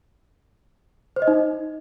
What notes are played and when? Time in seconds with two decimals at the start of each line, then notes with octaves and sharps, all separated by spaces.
1.16 C5
1.22 D#5
1.28 D#4